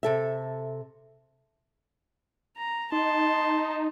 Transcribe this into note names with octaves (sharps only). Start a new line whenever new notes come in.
C3 A4 E5
A#5
D#4 A5 C6